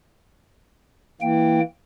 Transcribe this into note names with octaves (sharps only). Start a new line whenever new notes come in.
E3 A#3 G5